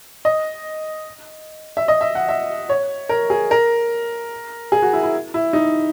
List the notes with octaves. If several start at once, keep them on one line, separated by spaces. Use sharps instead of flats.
D#5
E5
D#5
E5
F#5
E5
C#5
A#4
G#4
A#4
G#4
F#4
E4
E4
E4
D#4